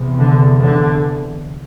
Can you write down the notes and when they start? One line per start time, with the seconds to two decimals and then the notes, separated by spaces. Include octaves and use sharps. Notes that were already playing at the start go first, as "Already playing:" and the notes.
Already playing: E2 C3
0.19 D3
0.62 D3